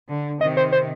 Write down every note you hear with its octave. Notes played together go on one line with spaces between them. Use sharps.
D3
C3 D#3 D#5
C5
C5